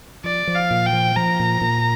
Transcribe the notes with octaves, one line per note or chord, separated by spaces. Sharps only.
F3 D5
F3
F5
A#2
G5
F3
F3 A#5
A#2
A#2